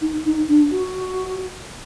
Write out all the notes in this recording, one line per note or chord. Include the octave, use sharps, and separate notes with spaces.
D#4
D#4
D4
F#4